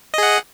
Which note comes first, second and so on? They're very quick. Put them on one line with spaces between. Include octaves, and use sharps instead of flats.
D#5 G#4 F#5